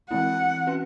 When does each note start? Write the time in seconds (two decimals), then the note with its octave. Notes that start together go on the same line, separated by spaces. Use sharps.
0.10 E3 G#3 C4 E4 F#5
0.67 C#4 F#4 B4